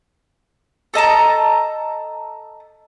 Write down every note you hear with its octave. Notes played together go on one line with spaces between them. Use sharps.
A4 D#5 A5 A#5